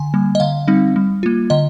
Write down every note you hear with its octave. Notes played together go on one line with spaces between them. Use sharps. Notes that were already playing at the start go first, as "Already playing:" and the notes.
Already playing: D3 G#5
G3 A#3
D#5
D3 F5
G3 C4 D#4
G3
A#3 F4
D3 D#5